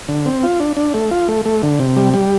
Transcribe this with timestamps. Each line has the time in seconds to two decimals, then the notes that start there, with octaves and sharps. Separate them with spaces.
0.08 D3
0.26 C4
0.43 F4
0.60 D4
0.77 D4
0.94 A3
1.11 F4
1.28 A3
1.45 A3
1.63 D3
1.79 C3
1.96 G3
2.14 G3